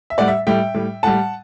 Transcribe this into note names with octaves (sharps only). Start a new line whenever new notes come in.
E5
A2 G3 D5 F#5
E5
A2 G3 E5 G5
A2 G3
A2 G3 F#5 A5